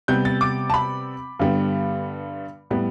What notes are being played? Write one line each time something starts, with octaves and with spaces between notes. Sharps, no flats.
C3 G3 B3 G6
A6
D6
A5
B5
G2 D3 G3 B3
A2 G3 B3